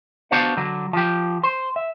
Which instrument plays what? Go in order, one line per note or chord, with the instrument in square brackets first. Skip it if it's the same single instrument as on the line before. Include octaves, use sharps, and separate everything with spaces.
[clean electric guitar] B3 D4 F#4 C5 F5 F#5
D3 F#3
F3 G4
C5
E5